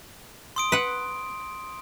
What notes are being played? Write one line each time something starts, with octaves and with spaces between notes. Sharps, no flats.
C6 D#6 D7
B4 F#5